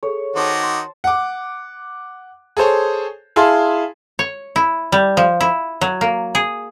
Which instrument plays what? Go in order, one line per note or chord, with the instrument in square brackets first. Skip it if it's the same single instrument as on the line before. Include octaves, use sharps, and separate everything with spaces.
[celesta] G#4 A4 [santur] C#5
[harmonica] D#3 D#4 F#4 [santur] C5 A5 [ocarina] D6
[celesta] C6
[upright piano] F#5 D6
G#4 A4 C5 C#5
E4 G#4 F5 A5 C6
[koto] C#5
E4
G3
F3
E4
F#3
A#3
G#4